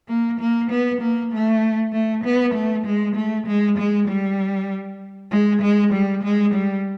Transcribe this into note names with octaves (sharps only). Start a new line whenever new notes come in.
A#3
A#3
B3
A#3
A3
A3
B3
A3
G#3
A3
G#3
G#3
G3
G#3
G#3
G3
G#3
G3